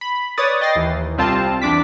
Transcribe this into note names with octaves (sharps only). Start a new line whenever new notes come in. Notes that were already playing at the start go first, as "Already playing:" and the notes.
B5
B4 C#5 D5 D#6 A6
D#5 G5 A6 A#6 C7
D#2 E3
C2 G3 C4 F4 A5
E2 D4 D6 B6